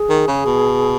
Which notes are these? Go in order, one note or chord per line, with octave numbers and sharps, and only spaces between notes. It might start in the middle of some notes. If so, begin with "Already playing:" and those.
Already playing: G#4
D#3
C#3
B2